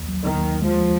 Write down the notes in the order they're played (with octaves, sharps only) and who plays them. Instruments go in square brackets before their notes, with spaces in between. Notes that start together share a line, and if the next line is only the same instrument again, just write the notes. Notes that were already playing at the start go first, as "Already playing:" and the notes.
Already playing: [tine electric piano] A#1 D#2
F#3
[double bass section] D#3
[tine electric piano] D#2
[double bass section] F3 [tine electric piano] G#3